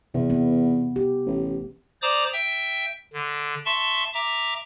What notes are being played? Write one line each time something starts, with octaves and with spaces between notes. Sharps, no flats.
E2 C3
B3
G4
A1
C5 D5 A#5 D6 D#6
E5 G5
D3
E5 A5 C6 C#6
E5 A#5 D6